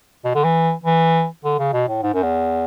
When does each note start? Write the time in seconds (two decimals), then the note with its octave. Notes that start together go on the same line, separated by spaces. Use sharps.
0.25 B2
0.35 D3
0.44 E3
0.84 E3
1.44 D3
1.59 C#3
1.73 B2
1.88 A2
2.03 G#2
2.14 F#2
2.23 E2